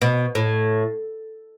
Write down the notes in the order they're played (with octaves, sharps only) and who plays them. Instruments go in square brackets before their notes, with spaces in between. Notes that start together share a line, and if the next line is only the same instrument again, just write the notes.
[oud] B2
A2